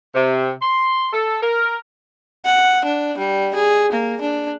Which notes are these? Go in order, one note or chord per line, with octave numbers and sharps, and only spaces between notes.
C3
C6
A4
A#4
F#5
D4
G3
G#4
A#3
D4